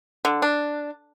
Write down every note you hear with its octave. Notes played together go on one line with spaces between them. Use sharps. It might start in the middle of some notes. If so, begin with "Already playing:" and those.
D3
D4